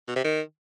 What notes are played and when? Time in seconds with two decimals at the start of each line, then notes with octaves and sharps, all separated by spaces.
0.08 B2
0.16 C3
0.24 D#3